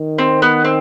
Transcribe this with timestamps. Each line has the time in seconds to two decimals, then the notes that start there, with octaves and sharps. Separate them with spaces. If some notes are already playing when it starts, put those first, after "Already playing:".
Already playing: D#3
0.19 C4
0.42 B3
0.65 C4